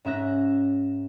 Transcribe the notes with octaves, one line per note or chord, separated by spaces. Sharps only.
G#2 C#4 E5 F#6 A#6